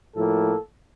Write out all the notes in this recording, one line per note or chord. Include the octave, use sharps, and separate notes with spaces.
A2 F3 A#3 A4